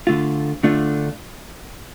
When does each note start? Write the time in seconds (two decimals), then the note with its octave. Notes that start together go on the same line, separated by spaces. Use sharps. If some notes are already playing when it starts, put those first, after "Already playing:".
0.07 D3 A3 F4
0.63 D3 A3 D4 F4